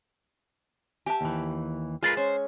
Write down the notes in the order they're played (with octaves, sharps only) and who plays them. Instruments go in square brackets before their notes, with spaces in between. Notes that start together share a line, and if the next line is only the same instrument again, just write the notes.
[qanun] G4 E5 [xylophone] G#5 A5
[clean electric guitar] D#2 E3
[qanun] G#3 [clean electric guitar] F4 A#4 B4 [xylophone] G#5 A6 C7
[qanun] C#4 C#6 [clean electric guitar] C5